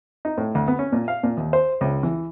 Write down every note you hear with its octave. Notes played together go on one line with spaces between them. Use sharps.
D#4
A2
D2
B3
C#4
A#2
F5
A#2
D#2
C5
C#2
E3